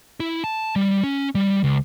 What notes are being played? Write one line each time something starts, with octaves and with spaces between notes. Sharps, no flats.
E4
A5
G3
C#4
G3
C#2